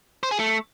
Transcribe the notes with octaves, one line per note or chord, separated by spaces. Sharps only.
C5
G#4
A3